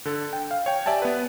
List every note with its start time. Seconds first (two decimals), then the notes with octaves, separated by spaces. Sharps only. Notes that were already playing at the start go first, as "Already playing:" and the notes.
0.05 D3 A4
0.33 G5
0.51 F5
0.66 C#5 G5
0.86 G4 D5 E5 G#5 A5
1.02 B3 B4